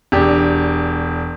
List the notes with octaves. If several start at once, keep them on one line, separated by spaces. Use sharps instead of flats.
E1 D4 G4